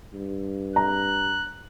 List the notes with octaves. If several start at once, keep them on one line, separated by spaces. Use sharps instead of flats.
G2
A#5 F#6